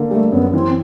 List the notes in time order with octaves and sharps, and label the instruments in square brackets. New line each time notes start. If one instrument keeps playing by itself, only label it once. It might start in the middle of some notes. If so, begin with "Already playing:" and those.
Already playing: [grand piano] D3 A#3
[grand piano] G3 [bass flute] A3
[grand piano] F#2 [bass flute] B3
[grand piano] E3 [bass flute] C4